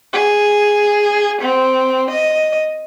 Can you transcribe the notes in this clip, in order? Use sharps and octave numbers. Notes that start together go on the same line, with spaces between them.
G#4
C4
D#5